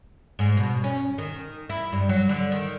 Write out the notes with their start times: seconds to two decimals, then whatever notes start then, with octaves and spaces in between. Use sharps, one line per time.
0.39 G#2
0.57 B2
0.84 C#4
1.18 D#3
1.69 E4
1.93 G2
2.09 F#3
2.29 D3
2.52 D#3